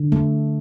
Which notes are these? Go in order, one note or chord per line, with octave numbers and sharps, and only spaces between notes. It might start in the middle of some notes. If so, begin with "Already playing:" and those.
Already playing: D3
A3